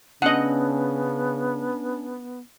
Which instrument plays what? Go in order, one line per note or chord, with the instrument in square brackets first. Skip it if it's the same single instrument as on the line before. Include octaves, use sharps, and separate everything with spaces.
[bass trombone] C#3 [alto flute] B3 [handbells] C#4 D4 [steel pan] D#5 F#5